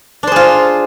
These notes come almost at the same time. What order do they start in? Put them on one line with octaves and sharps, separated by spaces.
D4 C5 G#4 F4